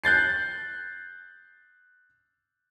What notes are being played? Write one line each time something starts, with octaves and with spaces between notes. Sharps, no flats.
F#6 G6 A6 C7